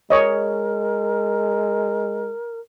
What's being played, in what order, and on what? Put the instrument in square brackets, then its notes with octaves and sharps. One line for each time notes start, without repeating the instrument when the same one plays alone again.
[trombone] G#3 [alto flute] A#4 [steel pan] C#5 D#5